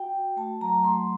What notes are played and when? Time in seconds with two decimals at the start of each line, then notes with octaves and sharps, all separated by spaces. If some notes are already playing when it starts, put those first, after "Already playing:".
Already playing: F#4 G5
0.13 F#4
0.36 A3 A5
0.61 F#3 A#5
0.84 A3 C6